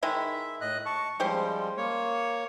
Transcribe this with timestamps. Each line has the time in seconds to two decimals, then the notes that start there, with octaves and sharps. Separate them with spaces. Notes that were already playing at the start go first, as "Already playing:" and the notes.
0.03 D#3 G#3 E4 E5
0.61 A2 D#5 F#6
0.86 A5 C#6
1.20 F3 G3 G#3 C#4 G4 C5
1.77 A#3 C#5